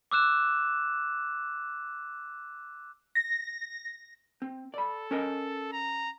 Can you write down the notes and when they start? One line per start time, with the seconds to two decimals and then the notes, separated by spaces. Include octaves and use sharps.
0.11 D6 E6 F#6 E7
3.15 A#6
4.42 C4
4.74 A4 D5 B5
5.11 C#4 A#4 D#5
5.72 A#5